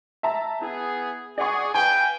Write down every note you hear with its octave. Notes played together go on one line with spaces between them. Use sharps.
E5 A5 A#5
B3 E4 G#4
G#4 D5 F#5 C#6
B4 F5 G5 G#5